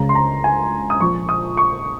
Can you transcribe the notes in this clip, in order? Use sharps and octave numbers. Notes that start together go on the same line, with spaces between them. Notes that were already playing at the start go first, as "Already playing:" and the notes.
Already playing: C#2 C#3 G#3 C#4 A#5
C6
A#5
G#5
D#6
A#1 A#2 F3 C#6
D#6
C#6